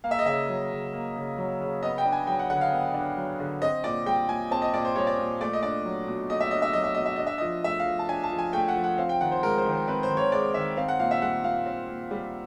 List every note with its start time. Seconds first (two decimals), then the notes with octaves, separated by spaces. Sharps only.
0.04 A#3 F5
0.11 E5
0.19 D#5
0.26 C#3 E5
0.49 F#3
0.71 C#3
0.93 A#3
1.16 C#3
1.38 F#3
1.61 C#3
1.83 B3 D#5
1.98 G5
2.05 D4
2.12 G#5
2.27 F#3 G5
2.39 F#5
2.50 D3 F#5
2.61 F5
2.72 B3
2.94 D4
3.17 F#3
3.40 D3
3.62 C4 D#5
3.84 A#2 D5
4.06 G3 G5
4.28 A#2 G#5
4.51 C4 A5
4.62 D#5
4.74 A#2 D5
4.85 C5
4.96 G3 C#5
5.07 D5
5.19 A#2
5.41 A3 D5
5.53 D#5
5.63 D4 D5
5.85 F#3
6.07 B2
6.30 A3 D#5
6.40 E5
6.51 D4 D#5
6.62 E5
6.73 F#3 D#5
6.84 E5
6.95 B2 D#5
7.06 E5
7.16 D4 D#5
7.27 E5
7.38 F3 D#5
7.64 A3 E5
7.80 F5
7.86 F3
7.99 A5
8.09 D4 G#5
8.24 A5
8.32 F3
8.39 G#5
8.53 A3 G5
8.68 F#5
8.76 F3
8.84 F#5
8.98 C4 F5
9.09 G5
9.21 D#3 F#5
9.31 C5
9.43 G#3 A#4
9.58 C5
9.65 D#3
9.72 C5
9.88 C4 B4
10.03 C5
10.10 D#3
10.17 C#5
10.32 G#3 D5
10.54 D#3 E5
10.77 C4 F5
10.88 F#5
10.99 A#2 F5
11.11 E5
11.22 G3 F#5
11.44 A#2 F5
11.66 C4
11.89 A#2
12.11 G3